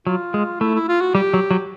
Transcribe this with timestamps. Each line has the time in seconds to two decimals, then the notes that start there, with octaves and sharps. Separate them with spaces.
0.07 F#3 F4
0.34 G#3
0.60 A3 E4
0.75 E4
0.88 F4
1.01 F#4
1.15 G3 G4
1.34 F#3
1.51 F#3